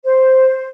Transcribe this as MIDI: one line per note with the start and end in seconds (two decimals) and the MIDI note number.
0.04 0.68 72